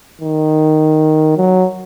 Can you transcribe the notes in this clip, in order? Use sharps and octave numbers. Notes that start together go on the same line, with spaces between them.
D#3
F#3